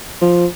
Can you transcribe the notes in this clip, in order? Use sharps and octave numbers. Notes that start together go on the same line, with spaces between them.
F3